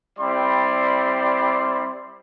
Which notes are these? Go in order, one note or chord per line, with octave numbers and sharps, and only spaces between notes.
G3 C4 E4 D5 C6